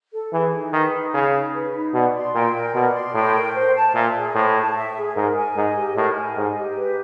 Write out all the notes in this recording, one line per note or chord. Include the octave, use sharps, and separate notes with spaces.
A4
E3 G#4
D#4
D#3 B4
D#4
C#3 G#4
D#4
B4
D#4
B2 D5
C6
A#2 G5
A#4
B2 D5
C6
A2 G5
A#4
C5
A5
A#2 E5
G#4
A2 C5
A5
E5
G#4
G#2 A#4
G#5
G#2 D#5
G4
A2 A#4
G#5
G#2 D#5
G4
B4